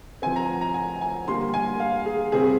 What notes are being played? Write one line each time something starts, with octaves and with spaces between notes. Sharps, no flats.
F3 C4 G#5
A#5
A#5
G#5
G#5
D3 G3 A#3 C6
G#5
F5
G#4
C3 G3 C4 G#4